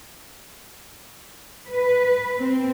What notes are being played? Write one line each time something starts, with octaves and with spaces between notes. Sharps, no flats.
B4
C4